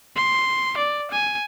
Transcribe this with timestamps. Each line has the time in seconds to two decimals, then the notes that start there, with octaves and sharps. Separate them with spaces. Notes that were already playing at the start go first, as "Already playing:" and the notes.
0.16 C6
0.77 D5
1.11 G#5